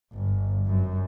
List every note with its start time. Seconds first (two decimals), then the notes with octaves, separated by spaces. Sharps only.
0.13 G1
0.66 F#2